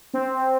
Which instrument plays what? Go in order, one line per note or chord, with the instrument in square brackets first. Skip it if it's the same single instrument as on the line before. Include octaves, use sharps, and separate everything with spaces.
[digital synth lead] C4